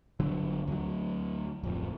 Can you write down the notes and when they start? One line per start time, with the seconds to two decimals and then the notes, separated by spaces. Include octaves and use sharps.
0.20 G1 D3 F#3
0.68 D2 F#3
1.63 D1 F2